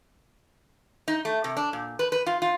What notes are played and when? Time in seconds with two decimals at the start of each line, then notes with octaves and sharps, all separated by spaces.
1.08 D#4
1.25 A3
1.44 C3
1.57 D4
1.73 A#2
1.99 B4
2.12 B4
2.26 F4
2.42 F4